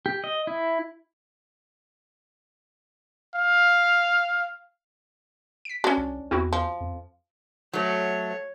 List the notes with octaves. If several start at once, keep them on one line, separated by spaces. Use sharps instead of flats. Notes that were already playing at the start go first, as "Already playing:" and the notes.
G4
D#5
E4
F5
B6 D7
C#4 D4 F#4
C2
E2 C4 E4 F#4
F3
F2
F#3 A3 C#5